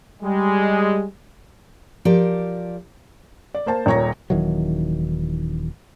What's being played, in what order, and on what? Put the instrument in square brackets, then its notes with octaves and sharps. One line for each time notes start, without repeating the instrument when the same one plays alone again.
[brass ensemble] G3 G#3
[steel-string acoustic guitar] F3 G4 A#4 D5
[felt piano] D5
A#3 C5 A5
D#1 A#2 C#5 A#5 A#6
[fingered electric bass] D#1 D#3 E3 F#3